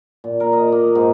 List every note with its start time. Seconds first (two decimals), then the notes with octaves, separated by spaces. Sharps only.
0.24 A#2
0.40 A#4
0.53 D#5
0.72 A#3
0.95 G#2